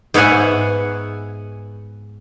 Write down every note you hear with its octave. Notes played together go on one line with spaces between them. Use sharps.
G#2 B3 C#5 E5 F#5 G#5